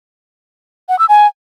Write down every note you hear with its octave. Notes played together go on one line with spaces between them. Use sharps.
F#5
E6
G#5